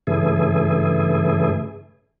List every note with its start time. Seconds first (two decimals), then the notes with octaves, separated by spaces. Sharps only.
0.07 G2 C#3 E3 A3 G#4